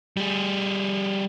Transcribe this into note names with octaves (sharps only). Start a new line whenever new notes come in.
G3 G#4